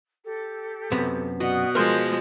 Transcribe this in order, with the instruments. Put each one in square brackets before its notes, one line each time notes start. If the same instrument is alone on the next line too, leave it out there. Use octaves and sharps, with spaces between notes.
[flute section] G4 A4
[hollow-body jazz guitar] F#2 C3 B3
[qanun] B2 D#5 [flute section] D5 F#5
[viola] F3 G#3 [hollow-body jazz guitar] A#4 C6 [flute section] G6